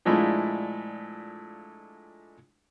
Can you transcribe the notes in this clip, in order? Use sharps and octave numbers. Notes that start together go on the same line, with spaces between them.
A#2 F3 G#3 A3 D4 E4